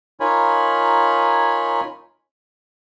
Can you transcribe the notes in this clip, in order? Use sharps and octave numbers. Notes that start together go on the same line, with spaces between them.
D#4 F4 A#4 C#5 G#5 B5